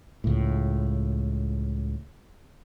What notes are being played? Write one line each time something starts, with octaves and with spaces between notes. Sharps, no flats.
C#2 A2